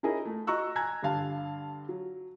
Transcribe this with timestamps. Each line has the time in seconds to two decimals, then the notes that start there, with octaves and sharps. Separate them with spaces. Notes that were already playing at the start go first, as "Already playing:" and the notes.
0.03 C#4 D#4 E4 G#4 A#4 D#5
0.25 A3
0.47 F#4 D#5 A#5 C#6 E6 F#6
0.76 G#5 A#5 E6 F#6 G#6
1.03 G2 D3 F5 A5
1.89 F#3